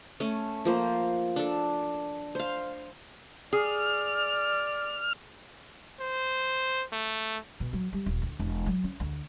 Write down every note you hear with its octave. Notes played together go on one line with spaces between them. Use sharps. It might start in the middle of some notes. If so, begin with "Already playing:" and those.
A3 C#4
F3 A#3 C5
D4 A4
C5 F5
G#4 D5 F6
C5
A3
B2
F#3
G3
D#1
D2
E1
F#3
C#4
D2